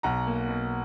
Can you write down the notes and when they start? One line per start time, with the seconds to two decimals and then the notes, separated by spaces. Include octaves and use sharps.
0.03 B1 F#5 A#5
0.27 A#3
0.49 B2